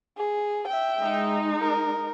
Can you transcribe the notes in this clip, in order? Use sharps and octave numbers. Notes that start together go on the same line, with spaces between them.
G#4
E5 G5
G#3 D#4
A#4